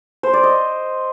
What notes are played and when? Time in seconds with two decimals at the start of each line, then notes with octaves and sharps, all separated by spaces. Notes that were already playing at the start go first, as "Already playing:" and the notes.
0.23 C5
0.33 D5
0.43 D#5